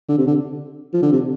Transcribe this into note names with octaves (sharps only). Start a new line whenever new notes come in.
D3
C3
D3
F3
D3
C3